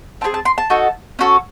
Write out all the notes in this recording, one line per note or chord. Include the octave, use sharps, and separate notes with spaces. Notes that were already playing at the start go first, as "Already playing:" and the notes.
C4 D#4 G#4 A5
A5
C6
A5
D#4 F#4 A4
C#4 F#4 A4